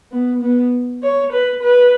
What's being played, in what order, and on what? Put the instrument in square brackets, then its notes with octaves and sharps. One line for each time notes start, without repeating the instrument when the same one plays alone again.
[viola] B3
B3
C#5
B4
B4